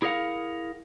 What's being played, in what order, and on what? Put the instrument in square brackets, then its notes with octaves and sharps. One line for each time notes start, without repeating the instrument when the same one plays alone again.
[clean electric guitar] E4 G#4 A#4 C#5 F5 F#5